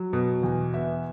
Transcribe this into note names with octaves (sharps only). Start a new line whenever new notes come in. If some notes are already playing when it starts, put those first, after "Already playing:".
Already playing: F#3
B2
E2
B3 E5